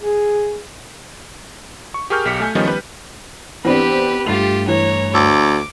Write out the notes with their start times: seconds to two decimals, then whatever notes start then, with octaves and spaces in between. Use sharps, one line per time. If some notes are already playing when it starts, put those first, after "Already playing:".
0.01 G#4
1.94 C#6
2.10 G4 G#4 A#4 C#6 F6 G6
2.25 B1 G4 B6 C#7
2.40 A3 G#5 G6
2.55 D#3 F3 G3 B3 C#4 D#4
2.67 G3 B4
3.65 E3 B3 C4 D4 G4 B4
4.26 G2 A3 F4 G4 A6 C7 F7
4.68 E3 C#5 A#5
5.14 D2 D6